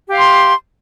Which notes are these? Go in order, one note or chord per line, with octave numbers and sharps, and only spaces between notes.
G4 F5 C6